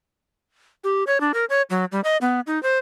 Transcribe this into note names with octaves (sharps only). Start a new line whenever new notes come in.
G4
C#5
D4
A#4
C#5
F#3
G3
D#5
B3
D#4
C5